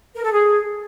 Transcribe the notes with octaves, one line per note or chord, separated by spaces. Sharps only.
A#4
A4
G#4